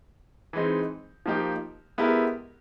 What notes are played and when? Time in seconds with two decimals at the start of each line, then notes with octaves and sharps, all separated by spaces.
0.53 E3 G#3 C4 D#4
1.26 F3 A#3 D#4 G4
1.98 G#3 B3 E4 G4 A#4